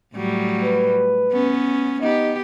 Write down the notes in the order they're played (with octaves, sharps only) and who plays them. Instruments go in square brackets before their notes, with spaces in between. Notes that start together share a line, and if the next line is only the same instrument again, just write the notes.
[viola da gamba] A2 F#3 G3
[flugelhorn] B4
[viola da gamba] B3 C#4
[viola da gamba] B3 G4 [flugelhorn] D#4